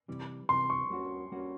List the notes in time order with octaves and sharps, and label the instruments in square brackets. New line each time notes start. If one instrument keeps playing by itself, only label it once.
[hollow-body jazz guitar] C3 E3 G3
[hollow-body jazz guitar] C3 E3 G3 [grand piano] C6
[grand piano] C#6
[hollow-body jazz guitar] G3 A#3 C#4 F#4
G3 A#3 C#4 F#4